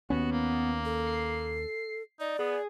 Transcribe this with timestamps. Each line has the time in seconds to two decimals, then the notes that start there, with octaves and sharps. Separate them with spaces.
0.10 D#2 B3 C#4 F#4
0.32 A#3
0.85 A4
1.07 C7
2.20 D#4 D5
2.39 B3 G#4